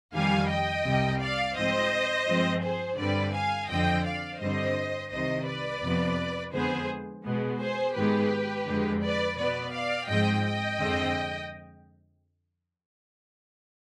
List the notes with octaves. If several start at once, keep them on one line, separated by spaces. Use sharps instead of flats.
F2 D#3 G3 F5 G#5
D#5 G5
C2 C3 G3
D5 F5
G#2 F3 C4 C5 D#5
G2 F3 G#3 C4
G#4 C5
G2 D3 G3 C4 B4 D5
F5 G#5
F2 D3 F3 C4 D#5 G5
D5 F5
G2 D3 G3 C4 C5 D#5
C2 C3 D#3 C5 D#5
B4 D5
F2 C3 F3 B3
F2 D3 G#3 B3 G#4 C5
B2 G#3 B3
G#4 C5
G#2 D#3 G#3 B3 G4 B4
F2 D3 G#3
B4 D5
B2 B3 B4 D5
D5 F5
G#2 F3 G#3 C4 D#5 G5
D#5 G5
F2 D3 G#3 C4